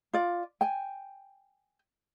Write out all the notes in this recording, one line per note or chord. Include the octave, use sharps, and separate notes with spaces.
F4 D5
G5 G#5